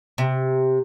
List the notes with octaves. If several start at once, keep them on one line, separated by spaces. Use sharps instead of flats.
C3